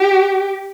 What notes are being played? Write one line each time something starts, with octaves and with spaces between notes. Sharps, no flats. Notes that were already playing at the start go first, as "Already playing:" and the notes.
Already playing: G4